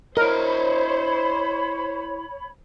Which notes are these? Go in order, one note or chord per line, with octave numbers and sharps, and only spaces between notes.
E4 A#4 C5 C#5 D#5 B5